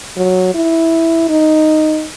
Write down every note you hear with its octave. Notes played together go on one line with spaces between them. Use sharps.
F#3
E4
D#4